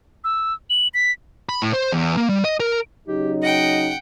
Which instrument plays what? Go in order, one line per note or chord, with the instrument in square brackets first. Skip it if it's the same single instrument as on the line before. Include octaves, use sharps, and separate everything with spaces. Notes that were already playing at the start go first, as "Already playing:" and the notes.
[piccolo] E6
F#7
B6
[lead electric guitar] B5
A2
C5
E2
A#3
G3
D#5
A#4
[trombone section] C#3 F#3 D#4 [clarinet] G4
[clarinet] D#5 [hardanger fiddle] F#5 G5